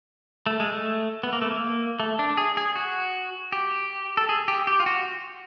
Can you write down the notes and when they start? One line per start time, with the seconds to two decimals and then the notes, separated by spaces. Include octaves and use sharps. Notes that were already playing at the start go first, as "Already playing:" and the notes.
0.46 A3
0.60 G#3
0.73 A3
1.23 B3
1.33 A#3
1.42 A3
1.51 A#3
2.00 A3
2.19 D4
2.37 G#4
2.57 G#4
2.76 F#4
3.52 G4
4.17 A4
4.29 G#4
4.48 G4
4.67 G4
4.80 F4
4.86 F#4